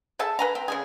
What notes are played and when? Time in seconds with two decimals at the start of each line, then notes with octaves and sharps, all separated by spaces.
0.19 G#4 A4 E5 A5
0.39 B4 G#5 A#5
0.55 C4
0.68 C#3 F#3 G#4